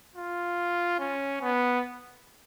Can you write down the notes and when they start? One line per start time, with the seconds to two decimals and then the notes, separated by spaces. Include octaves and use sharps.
0.16 F4
0.99 C#4
1.42 B3